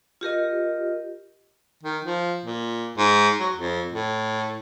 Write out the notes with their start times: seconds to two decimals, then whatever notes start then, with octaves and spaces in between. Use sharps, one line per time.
0.21 F4 G4 A#4 D#5
1.83 D#3
2.05 F3
2.45 A#2
2.98 G#2
3.40 F#3
3.55 F2
3.93 A2